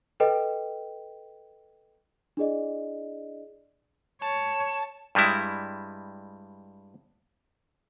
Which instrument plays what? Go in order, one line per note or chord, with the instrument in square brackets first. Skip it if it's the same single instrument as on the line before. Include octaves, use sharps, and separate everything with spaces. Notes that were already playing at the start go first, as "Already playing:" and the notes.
[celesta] A4 B4 D#5 G5
D4 E4 G#4 D5 D#5
[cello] C#5 [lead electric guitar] A5
[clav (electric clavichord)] G2 G3 G#3 E4